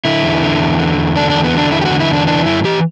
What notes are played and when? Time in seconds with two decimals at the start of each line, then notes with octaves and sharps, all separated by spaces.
0.05 D3 E4
0.23 E2
0.42 D3
0.60 E2
0.80 D3
0.97 E2
1.16 D3 D4
1.30 E2 D4
1.44 B3
1.54 D3 D4
1.71 E2 E4
1.81 G4
1.85 F#4
1.91 D3
2.00 E4
2.09 E2 D4
2.27 E3 D4
2.46 F#2 E4
2.64 E3 G4